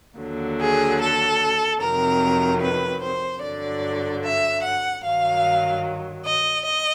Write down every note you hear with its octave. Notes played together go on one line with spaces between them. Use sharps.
D#2 D3 F#3
G#4
A4
F2 C3 D#3 F#3 A#4
B4
C5
G2 D3 F#3 D5
E5
F#5
G2 D#3 F#3 F5
D#5
D#5